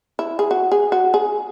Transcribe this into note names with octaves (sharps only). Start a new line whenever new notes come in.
E4
G#4
F#4
G#4
F#4
G#4